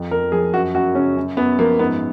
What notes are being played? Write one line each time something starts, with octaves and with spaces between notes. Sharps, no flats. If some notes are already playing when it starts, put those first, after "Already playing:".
Already playing: F2
F2 A#4
F3 G#4
F#2 F#4
F#2 F#4
C#3 C#4
F#2
F#2 B3
F3 A#3
G#2 B3